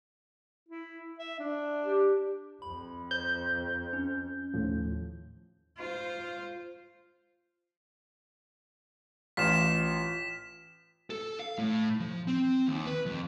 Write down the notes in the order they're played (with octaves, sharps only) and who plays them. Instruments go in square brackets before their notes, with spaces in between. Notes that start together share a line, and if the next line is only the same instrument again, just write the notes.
[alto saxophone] E4
E5
D4
[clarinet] G4
[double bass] F2 [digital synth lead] B5
[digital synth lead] C5 [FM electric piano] G6
[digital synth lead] C#4
[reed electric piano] D#2 A2 F3
[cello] F4 C5
[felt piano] A1 F4 F6 [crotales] B6 E7
[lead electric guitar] A4
F5
A2
F3
C4
D#2
B4
F2